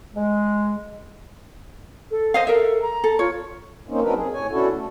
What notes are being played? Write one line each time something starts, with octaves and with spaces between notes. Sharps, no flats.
G#3
A4
C5 D#5 F5
A4 A#4 E5
A#5
A4
F4 C#5
A#3 C4 C#4 D#4
F#3 C4 D4 D#4 A#4 B4
C3 G#4
A2 C#5 G#5
B2 C#4 D4 E4 F#4 A4
A3